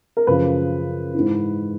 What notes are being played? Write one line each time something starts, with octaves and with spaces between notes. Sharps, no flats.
A#4
F#2 C#3 F3 B4
G#2 E3